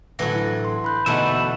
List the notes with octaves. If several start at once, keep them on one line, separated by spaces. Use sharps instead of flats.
A2 D3 E3 F#3 A#6
E4
C6
B5 F#6 G6
E2 B2 D3 A3 D#4 B4 E5